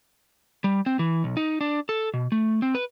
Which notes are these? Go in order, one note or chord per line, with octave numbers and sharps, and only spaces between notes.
G3
C4
E3
B1
D#4
D4
A4
B2
A3
C4
B4